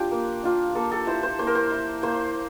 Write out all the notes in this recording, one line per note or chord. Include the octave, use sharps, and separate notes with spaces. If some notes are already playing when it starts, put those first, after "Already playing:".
Already playing: D4 F4 G4
A#3
D4 F4
A#3 A4
A4
E4 C5
C5
A#3 C5
A#4
C5
E4
A#3 C5